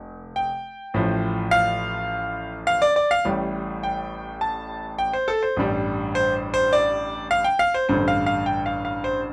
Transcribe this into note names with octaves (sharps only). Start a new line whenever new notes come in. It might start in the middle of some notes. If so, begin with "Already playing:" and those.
Already playing: F1
G5
A1 A2 F3
F5
F5
D5
D5
F5
A1 A2 G3
G5
A5
G5
C5
A4
C5
A1 G2 G3
C5
C5
D5
F5
G5
F5
C5
A1 G2 D3 C5
F5
F5
G5
F5
F5
C5